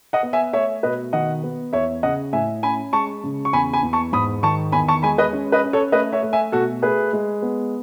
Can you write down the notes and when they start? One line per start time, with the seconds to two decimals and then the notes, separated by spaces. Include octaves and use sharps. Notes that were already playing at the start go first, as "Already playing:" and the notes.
0.13 D#5 F#5
0.23 B3
0.33 E5 G#5
0.53 A3 C#5 E5
0.83 B2 B4 D#5
1.13 D#3 D#5 F#5
1.44 B3
1.73 E2 C#5 E5
2.03 C#3 D#5 F#5
2.33 A2 E5 G#5
2.63 C#4 G#5 B5
2.93 G#3 A5 C#6
3.24 C#3
3.45 C#6
3.53 E2 G#5 B5
3.73 G#5 B5
3.83 E2
3.93 A5 C#6
4.12 G#2 B5 D#6
4.43 D#3 A5 C#6
4.72 E2 G#5 B5
4.88 A5 C#6
5.03 G#3 G#5 B5
5.18 B4 D#5
5.33 C#4
5.52 B4 D#5
5.64 C#4
5.73 A4 C#5
5.92 A3 B4 D#5
6.12 C#5 E5
6.23 A3
6.33 E5 G#5
6.52 B2 F#4 A4
6.82 A3 G#4 B4
7.13 G#3
7.42 B3